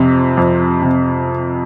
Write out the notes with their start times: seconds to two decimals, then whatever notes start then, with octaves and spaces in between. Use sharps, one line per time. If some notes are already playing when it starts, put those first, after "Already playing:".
Already playing: F2 C3
0.37 F2
0.82 C3